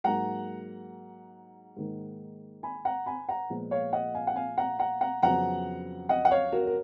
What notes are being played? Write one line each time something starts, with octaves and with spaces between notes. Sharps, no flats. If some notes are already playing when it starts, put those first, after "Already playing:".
G#2 F#3 A#3 F#5 A#5
G#2 D#3 A#3
G#5 B5
F#5 A#5
G#5 B5
F#5 A#5
A#2 F3 G#3 B3
C#5 F5
D#5 F#5
F5 G#5
F#5
F5 G#5
F#5 A#5
F#5 A#5
F#5 A#5
F2 C#3 F#3 B3 F#5 A#5
D#5 F#5
F#5
C#5 F5
F#4 A#4
A#4